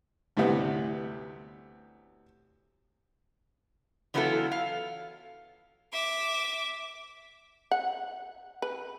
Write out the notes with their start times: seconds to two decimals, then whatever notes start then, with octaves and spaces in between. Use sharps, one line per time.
0.37 D2 A2 C3 G3 B3
4.14 E3 F#3 B3 E4 F4 A4
4.52 F5
5.93 E5 D6
7.71 F#5
8.62 B4